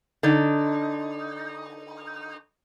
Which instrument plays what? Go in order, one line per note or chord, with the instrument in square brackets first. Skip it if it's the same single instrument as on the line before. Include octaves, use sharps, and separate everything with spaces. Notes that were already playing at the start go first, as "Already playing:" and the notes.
[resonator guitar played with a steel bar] D3 D4 D#4